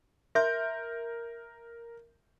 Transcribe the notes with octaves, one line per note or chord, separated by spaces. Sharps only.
A#4 E5 C6 G6